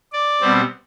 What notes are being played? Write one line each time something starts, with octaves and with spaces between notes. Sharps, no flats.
D5
B2 G3 C4